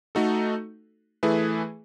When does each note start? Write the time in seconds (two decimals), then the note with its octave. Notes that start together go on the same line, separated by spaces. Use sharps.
0.15 A3 D#4 F#4 A4
1.23 E3 A3 E4 G#4 B4